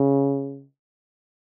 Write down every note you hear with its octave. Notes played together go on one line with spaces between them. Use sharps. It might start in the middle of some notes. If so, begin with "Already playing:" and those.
Already playing: C#3